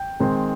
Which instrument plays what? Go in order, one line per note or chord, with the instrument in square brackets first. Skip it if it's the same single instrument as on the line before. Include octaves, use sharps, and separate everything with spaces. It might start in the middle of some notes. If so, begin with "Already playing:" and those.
Already playing: [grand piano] G5
D#3 G#3 C4 D#4